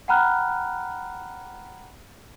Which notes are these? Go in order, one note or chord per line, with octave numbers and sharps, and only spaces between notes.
F#5 G5 A#5 B5 F6 F#6